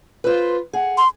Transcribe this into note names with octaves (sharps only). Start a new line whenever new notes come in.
F4 B4 C5
G#4 F#5
C6